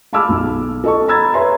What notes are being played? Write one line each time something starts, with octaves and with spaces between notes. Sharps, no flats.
F5 A5 B5 D6 E6 F6
B1
A4 D#5 A5 C#6
A#5 B5 E6 G#6 A6
B4 C#5 E5 A#5 C6